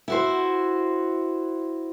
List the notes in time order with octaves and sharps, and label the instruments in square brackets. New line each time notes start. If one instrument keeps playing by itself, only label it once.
[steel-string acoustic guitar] E4 F#4 C5